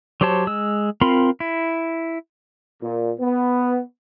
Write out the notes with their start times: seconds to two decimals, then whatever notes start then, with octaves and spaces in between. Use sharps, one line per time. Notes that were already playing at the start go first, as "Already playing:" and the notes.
0.21 F#3 G4 C5 C#5 A5
0.47 G#3 E6
1.01 C4 F4 A#4 B5 C6
1.40 E4
2.82 A#2
3.19 B3